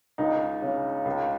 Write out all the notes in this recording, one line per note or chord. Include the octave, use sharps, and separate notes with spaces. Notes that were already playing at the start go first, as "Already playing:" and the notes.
C#2 D#4
C#3
C#2